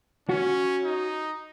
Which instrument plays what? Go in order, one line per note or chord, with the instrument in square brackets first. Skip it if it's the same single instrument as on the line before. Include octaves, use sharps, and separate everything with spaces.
[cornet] C#4 [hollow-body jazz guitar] F#4
[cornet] D#4